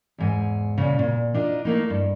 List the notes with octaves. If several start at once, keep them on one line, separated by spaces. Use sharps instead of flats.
E2 G#2 G#5
A#2 C#3
A#2
D4 D#4 F4
A3 A#3 D#4
G2